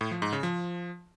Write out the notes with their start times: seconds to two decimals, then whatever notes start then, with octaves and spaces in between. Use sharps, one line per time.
0.01 A2
0.11 F3
0.22 G#2
0.33 C#3
0.43 F3